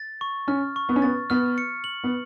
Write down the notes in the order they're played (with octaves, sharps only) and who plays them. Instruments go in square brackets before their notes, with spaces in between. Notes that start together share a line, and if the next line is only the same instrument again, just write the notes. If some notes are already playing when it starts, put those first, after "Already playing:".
Already playing: [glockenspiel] A6
C#6
[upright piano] C#4 [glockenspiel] F6
[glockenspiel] C#6
[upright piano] B3
C#4
[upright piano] B3 [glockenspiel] A6
[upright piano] B3 [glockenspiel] F6
[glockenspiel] C#7
F#7
[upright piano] B3